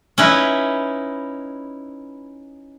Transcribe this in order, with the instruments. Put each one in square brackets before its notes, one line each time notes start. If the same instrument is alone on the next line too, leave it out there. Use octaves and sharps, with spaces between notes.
[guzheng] C#4 D#4 E4 B4